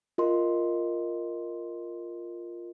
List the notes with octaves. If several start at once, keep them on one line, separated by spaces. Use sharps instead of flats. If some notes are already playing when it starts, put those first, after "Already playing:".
F4 A#4 D#5 C6